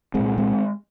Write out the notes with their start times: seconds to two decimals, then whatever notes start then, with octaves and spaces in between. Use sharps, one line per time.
0.14 C2 A#2 G#3 C4
0.38 G#3 C4